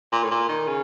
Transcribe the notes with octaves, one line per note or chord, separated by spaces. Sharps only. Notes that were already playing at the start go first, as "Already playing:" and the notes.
A#2
A2
A#2
D#3
C#3